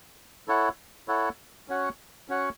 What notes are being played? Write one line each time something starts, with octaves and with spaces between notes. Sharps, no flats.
E4 A4 C#5 F#5
E4 A4 C#5 F#5
C#4 F#4 C#5 F#5
C#4 F#4 C#5 F#5